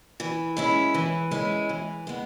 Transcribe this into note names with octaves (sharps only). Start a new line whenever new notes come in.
E3
G#3 C#4 E4
E3
G#3 C#4 E4
E3
G#3 B3